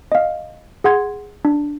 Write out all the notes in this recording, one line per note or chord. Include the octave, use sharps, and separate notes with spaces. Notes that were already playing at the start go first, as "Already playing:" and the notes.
D#5 F5
G#4 F#5 C6 G#6
D4